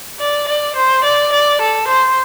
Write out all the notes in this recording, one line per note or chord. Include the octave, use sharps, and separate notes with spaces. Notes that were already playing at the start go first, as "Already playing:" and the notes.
D5
D5
C5
D5
D5
A4
C5